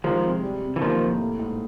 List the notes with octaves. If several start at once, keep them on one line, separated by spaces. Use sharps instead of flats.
D#3 F3 G#3
C3
G3
C3
E3
D#3 F3 A#3
A2
A3
G#2